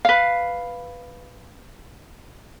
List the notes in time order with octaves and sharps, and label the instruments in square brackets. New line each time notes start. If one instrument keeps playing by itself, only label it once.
[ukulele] B4 F5